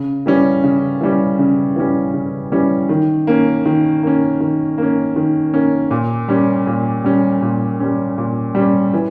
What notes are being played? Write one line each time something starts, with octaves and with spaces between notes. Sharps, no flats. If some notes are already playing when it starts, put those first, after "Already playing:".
Already playing: C#3
E3 G3 C#4
C#3
E3 G3 C#4
C#3
E3 G3 C#4
C#3
E3 G3 C#4
D#3
A#3 C#4
D#3
A#3 C#4
D#3
A#3 C#4
D#3
A#3 C#4
A#2
G3 C#4
A#2
G3 C#4
A#2
G3 C#4
A#2
G3 C#4
E3